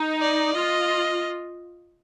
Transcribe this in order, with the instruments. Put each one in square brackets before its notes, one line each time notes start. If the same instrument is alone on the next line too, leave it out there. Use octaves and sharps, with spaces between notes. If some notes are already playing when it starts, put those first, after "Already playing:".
Already playing: [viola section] D#4
[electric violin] D5
[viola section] F4 [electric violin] D#5